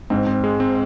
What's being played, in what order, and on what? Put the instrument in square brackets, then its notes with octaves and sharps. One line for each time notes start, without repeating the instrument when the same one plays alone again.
[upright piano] G#2 [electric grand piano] C4
[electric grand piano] C4
G#3
C4